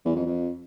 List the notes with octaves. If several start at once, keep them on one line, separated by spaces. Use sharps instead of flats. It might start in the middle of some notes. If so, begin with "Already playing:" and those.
E2
F2
F2